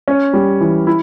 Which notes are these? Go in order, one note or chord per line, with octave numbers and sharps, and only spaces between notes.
C#4
G3
E3
E4